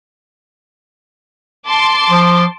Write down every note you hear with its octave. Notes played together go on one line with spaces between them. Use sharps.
A5 C6 D6
F3